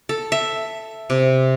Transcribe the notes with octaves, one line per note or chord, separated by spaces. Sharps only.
A4
E5
C3